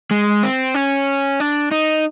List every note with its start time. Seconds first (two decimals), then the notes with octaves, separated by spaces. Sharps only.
0.11 G#3
0.43 C4
0.75 C#4
1.40 D4
1.71 D#4